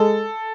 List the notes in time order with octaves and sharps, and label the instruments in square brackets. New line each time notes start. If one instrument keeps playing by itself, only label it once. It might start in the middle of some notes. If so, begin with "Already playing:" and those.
Already playing: [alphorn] G#3 [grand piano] A4